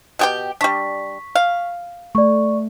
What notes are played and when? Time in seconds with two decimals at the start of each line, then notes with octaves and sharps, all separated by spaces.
0.19 B2 G4 G5
0.61 G3 D4 C#6 B6
1.35 F5
2.15 A3 D5 C#6